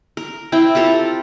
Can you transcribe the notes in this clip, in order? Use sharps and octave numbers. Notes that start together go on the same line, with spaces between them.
A#4
C4 E4 G5
F4 G4 A4 A#5